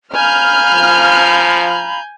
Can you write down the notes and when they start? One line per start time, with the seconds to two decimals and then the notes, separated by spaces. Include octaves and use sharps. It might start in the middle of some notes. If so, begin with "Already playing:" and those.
0.15 F5 G#5 A#5 B5 F6 G6
0.72 F3